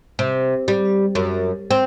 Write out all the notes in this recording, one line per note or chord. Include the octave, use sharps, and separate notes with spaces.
C3
G3
F#2
C4